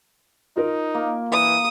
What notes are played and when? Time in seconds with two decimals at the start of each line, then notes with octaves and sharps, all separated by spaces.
0.56 D#4 F4 A#4
0.94 A#3
1.32 E3 D#6